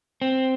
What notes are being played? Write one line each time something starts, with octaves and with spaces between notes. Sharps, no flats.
C4